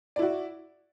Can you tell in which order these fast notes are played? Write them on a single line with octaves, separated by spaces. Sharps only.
D5 E4 F#4